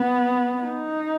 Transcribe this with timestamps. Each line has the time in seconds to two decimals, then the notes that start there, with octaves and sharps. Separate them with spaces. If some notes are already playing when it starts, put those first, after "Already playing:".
Already playing: B3
0.62 D#4